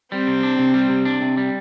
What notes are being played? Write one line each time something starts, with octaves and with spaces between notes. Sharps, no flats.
G3 C4
C3
D4
C3
G3
C3
D4
C3
G3